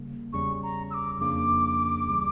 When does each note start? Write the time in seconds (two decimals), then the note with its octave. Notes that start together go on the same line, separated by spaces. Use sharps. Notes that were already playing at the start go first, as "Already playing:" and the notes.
Already playing: C#3 G3 A#3
0.33 E2 C#3 G3 C#4 C#6
0.63 A#5
0.91 E6
0.94 D6
1.19 F2 C#3 F3 A#3 D4 D6
2.06 D2 C#3 E3 G3